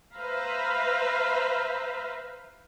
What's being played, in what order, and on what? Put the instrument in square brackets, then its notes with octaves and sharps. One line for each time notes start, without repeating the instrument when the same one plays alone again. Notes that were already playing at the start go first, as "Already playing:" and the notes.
[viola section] B4 C5 E5 F5 A#5 B5